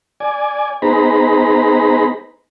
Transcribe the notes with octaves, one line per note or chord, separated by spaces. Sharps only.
D5 G#5
B3 D#4 G#4 C5 A#5 B5